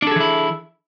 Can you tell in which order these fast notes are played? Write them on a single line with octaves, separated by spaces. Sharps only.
D4 A4 G#4 E3 E4